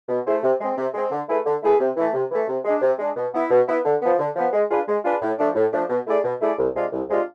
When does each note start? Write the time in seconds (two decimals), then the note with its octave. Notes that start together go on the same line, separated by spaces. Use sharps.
0.09 B2
0.26 A3 E4 G#4 C5
0.43 C3
0.61 G#3 C4
0.77 C3
0.94 G#3 C4
1.11 D3
1.28 A3 E4 G#4 B4
1.45 D3
1.62 A3 E4 G#4 B4
1.80 C3
1.96 E3 A3
2.14 C3
2.31 E3 A3
2.48 C3
2.64 G#3 D4
2.82 C3
2.99 G#3 D4
3.16 B2
3.34 B3 E4
3.51 B2
3.68 B3 E4
3.85 D3
4.02 F3 B3
4.19 D3
4.36 F3 B3
4.53 G#3
4.70 D4 F4 G#4 B4
4.88 G#3
5.04 D4 F4 G#4 B4
5.21 A2
5.39 F3 A3 D4
5.55 A2
5.73 F3 A3 D4
5.89 B2
6.07 A3 E4 G#4 D5
6.24 B2
6.41 A3 E4 G#4 D5
6.58 C2
6.75 C3 G#3 D4 F4
6.92 C2
7.09 C3 G#3 D4 F4